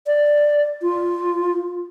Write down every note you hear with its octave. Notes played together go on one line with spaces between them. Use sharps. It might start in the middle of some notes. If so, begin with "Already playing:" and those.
D5
F4